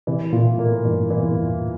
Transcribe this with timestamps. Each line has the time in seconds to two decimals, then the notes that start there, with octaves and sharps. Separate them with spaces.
0.07 C3 E3
0.33 A#2 F4
0.58 A2 A#3
0.85 G2 E3
1.10 E3
1.23 E2
1.36 F4